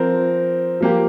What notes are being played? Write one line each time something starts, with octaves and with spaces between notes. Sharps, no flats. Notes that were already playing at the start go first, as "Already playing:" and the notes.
Already playing: F3 C4 A#4
F3 A#3 G4